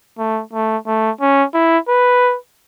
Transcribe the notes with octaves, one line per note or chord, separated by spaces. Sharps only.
A3
A3
A3
C#4
E4
B4